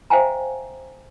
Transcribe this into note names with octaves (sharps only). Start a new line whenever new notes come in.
C5 E5 F5 G5 G#5 A#5